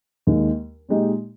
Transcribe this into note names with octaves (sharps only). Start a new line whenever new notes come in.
D#2 D#3 G#3
A#2 G#3 D#4 G4